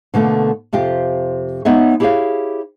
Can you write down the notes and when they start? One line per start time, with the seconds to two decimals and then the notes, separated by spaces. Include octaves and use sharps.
0.14 B2 D3 A3 A#3
0.73 F2 C3 F4 G4
1.65 G#3 B3 D#4 C#5 D#5 E5
2.00 E4 G4 G#4 C5 C#5 F5